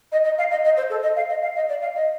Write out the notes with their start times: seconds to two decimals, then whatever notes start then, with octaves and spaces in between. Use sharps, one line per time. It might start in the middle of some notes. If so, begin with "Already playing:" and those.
0.11 D#5
0.24 D#5
0.38 F5
0.50 D#5
0.64 D#5
0.76 C5
0.89 A4
1.02 D#5
1.16 F5
1.29 D#5
1.42 F5
1.55 D#5
1.68 D5
1.81 F5
1.94 D#5